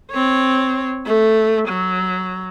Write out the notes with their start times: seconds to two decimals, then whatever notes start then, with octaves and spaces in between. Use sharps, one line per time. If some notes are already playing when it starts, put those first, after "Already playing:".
0.11 C4 C#5
1.06 A3
1.69 F#3